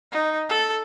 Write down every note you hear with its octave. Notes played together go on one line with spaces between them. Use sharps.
D#4
A4